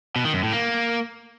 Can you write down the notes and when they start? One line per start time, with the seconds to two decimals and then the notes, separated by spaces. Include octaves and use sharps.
0.16 B2
0.25 D#3
0.34 F#2
0.43 A2
0.52 A#3